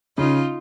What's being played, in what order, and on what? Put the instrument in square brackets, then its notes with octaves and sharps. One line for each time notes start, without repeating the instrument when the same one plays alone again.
[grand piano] C#3 [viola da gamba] D#4 F4